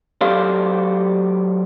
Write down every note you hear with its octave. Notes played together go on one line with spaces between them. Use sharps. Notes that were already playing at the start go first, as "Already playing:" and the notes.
F#3 G4 A4 C5 D5 F5